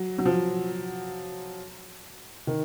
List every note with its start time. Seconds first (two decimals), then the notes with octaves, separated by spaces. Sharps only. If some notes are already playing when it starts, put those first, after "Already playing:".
Already playing: F#3
0.18 F#3
0.25 F3
2.47 D#3